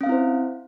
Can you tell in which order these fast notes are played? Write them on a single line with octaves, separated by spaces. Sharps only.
C#4 F5 C4 E4 C5